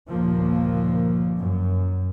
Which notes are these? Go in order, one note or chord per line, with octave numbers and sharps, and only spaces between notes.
G1 D#2 A#2 F3 A#3
F#2